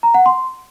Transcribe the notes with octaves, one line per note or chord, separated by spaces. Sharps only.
A#5
F#5
C6